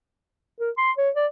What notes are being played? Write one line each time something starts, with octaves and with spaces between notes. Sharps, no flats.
A#4
C6
C#5
D5